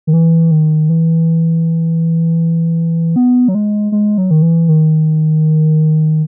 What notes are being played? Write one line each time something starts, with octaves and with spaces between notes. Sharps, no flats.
D#3
E3
D#3
E3
B3
F#3
G#3
G#3
F#3
D#3
E3
D#3